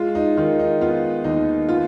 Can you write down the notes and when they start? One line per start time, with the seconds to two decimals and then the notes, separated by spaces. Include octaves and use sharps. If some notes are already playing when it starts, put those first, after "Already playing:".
Already playing: G#3 F4
0.15 D#4
0.37 D#3 F4
0.59 D#4
0.81 B3 F4
1.24 D#2 D#4
1.69 B3 F4